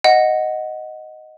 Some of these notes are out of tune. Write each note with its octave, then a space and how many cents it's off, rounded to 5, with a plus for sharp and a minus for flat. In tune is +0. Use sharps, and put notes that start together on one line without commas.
D#5 +0 F#5 +0